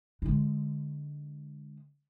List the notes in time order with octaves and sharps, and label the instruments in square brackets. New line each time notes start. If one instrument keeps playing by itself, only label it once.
[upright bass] D3 G#3